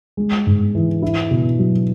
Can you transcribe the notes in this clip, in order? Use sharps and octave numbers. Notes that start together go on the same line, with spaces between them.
G#3
G#2
E3
E4
B2
F#3